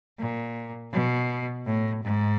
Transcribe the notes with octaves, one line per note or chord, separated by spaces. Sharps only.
A#2
B2
A2
G#2